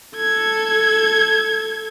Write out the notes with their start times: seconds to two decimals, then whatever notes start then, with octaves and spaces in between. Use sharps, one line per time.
0.15 A4 G#6